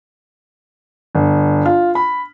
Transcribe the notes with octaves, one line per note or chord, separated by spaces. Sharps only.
G1
F4
B5